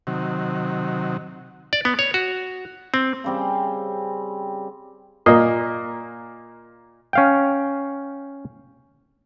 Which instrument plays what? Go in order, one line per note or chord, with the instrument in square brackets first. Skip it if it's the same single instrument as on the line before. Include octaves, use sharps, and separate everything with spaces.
[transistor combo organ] C3 D#3 F#3
[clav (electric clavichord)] D5
B3
C#5
F#4
C4
[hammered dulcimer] C#3 G3 C4
[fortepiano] A#2 A#3 D#5
[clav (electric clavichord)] C#4 F5 G5